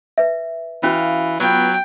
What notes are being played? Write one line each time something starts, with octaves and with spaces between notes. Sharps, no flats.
B4 E5
E3 C#4 F#4 F5
F#3 B3 F4 G5